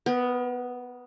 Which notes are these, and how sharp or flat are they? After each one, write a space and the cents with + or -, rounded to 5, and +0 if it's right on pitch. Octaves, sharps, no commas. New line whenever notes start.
B3 +5 A#4 +45